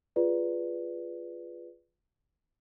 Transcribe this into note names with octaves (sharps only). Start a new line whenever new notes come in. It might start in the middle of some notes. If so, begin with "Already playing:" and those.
F4 G#4 B4 D5